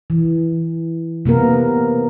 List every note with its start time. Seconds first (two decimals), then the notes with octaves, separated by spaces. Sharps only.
0.10 E3
1.25 C3 A#3 B3 A#4